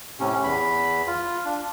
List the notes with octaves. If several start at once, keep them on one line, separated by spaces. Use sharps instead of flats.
A2 C3 C#4
E2 B5
F4
D4